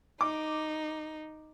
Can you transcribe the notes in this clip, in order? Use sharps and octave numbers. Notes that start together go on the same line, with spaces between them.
D#4 D6